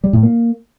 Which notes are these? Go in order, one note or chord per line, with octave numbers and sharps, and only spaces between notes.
G3
A2
A#3